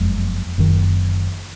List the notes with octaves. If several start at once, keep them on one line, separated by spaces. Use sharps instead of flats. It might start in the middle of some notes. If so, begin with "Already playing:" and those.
Already playing: F#1 F2 F3 G#3
F#1 F#2 D#3